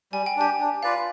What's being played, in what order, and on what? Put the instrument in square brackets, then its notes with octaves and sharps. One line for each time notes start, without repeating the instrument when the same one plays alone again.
[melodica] G3 [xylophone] G#5
[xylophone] G5
[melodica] D4 G4 [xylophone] G#5
[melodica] D4
[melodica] F4 B4 D5 [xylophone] F5